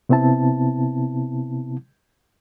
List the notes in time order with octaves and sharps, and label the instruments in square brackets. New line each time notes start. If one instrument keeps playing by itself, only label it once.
[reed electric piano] C3 B3 C4 E4 A5